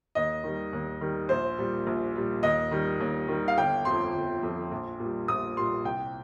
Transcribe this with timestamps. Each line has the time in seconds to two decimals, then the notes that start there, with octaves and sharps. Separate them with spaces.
0.15 D#2 D#5
0.44 D#3 G3
0.73 D#2
1.01 D#3 G3
1.29 A#1 C5
1.58 A#2 G3
1.87 A#1
2.16 A#2 G3
2.43 D#2 D#5
2.71 D#3 G3
3.00 D#2
3.28 D#3 G3
3.48 F5
3.57 G1 G5
3.85 F2 F3 C6
4.14 G1
4.43 F2 F3
4.71 A#1
5.00 A#2 G3
5.28 A#1 D#6
5.56 A#2 G3 C6
5.84 C2 G5